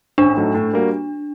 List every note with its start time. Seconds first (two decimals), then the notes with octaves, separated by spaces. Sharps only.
0.18 A1 D4
0.37 A2 F#3 A3 D#4
0.55 A2
0.74 G3 A#3 F#4